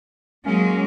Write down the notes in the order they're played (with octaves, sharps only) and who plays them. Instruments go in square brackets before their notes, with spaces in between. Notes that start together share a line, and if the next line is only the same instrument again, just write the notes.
[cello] F#3 G#3 [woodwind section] A#3 C#4